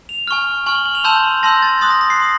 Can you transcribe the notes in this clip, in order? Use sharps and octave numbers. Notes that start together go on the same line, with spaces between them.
F7
G#5 C#6 F6
G#5 C#6 F6 F#7
G7
F#7
F7
A5 C6 E6 G6 E7
A5 C6 E6 G6 A#6
A6
C6 D#6 F#6 A6
A#6
A#6
C7
C6 D#6